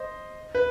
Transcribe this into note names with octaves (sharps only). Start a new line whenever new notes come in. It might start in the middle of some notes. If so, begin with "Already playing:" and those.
Already playing: C5 D#5
B4